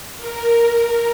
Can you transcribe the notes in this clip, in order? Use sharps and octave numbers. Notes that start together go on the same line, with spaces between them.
A#4